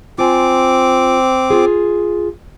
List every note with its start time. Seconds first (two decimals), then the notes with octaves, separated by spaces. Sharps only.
0.18 C4 F4 G#5 D6
1.50 F4 G#4